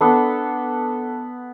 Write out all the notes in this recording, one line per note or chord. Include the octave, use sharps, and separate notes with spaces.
B3 D4 A4